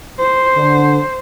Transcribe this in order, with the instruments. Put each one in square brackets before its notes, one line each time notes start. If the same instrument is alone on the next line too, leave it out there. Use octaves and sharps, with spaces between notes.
[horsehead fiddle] C5
[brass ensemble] D3